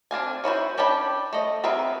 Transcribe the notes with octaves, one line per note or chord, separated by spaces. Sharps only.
C4 D4 F5 G#5
C#4 E4 F#4 C5
C#4 D4 G5 A5 B5
A3 D#5
B3 C4 G#4 A#4 E5